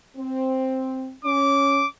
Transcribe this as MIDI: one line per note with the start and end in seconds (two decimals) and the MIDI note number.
0.17 1.15 60
1.25 1.83 61
1.25 1.86 86